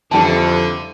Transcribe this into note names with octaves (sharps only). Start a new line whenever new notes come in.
F2 D3 E3 G3 D4 G5 A5